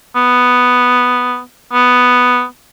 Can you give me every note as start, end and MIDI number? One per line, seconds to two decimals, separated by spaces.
0.16 1.40 59
1.73 2.43 59